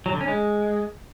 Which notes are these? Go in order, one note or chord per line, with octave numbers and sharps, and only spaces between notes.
F#3
D3
C#4
G#3